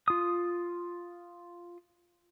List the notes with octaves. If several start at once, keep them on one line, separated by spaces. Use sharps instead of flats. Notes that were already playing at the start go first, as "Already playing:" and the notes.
F4 D#6